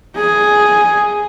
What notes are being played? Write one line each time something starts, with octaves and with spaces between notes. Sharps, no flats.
G#4